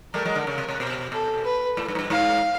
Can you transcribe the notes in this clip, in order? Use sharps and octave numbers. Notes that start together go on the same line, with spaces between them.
G3 A3 A#4
F#3 G#3
D3
C#3
C3
C3
B2
B2 A4
B4
A2
G2
G#2
G2
G#2 F5